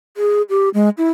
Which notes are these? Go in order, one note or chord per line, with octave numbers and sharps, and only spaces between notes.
G#4
G4
G#3
E4